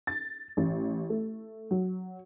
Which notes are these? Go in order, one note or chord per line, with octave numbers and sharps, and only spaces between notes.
A6
A1
A3
F#3